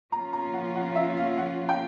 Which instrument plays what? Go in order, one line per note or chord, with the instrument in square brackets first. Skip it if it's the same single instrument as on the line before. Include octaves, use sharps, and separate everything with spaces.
[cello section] F3 A#3 C#4 F4 [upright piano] A#5
[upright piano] A#5
F#5
F#5
E5
F5
F#5
G5